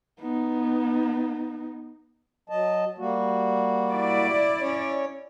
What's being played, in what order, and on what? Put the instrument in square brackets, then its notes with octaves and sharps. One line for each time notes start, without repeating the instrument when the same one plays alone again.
[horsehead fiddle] B3 D#4
[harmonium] F#3 D#5 A5
G3 A#3 F#4
[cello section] E4 D5
[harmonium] C#4 C#5